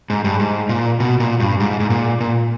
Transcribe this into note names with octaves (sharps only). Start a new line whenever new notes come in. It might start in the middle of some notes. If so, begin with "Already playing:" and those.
G#2
G2
G#2
A#2
B2
A#2
G2
G#2
G#2
A#2
A#2